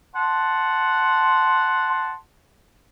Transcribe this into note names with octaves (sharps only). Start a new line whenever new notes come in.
F#5 A5 C6